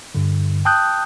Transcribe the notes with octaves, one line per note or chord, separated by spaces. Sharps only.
G2 D3
G5 A5 D#6 F#6 G6